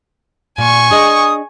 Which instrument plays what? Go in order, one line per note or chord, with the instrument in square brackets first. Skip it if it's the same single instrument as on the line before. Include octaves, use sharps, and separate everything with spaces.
[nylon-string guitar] A#2 [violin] G#5 C#6
[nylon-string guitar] D4 G#4 D#5 [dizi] D#6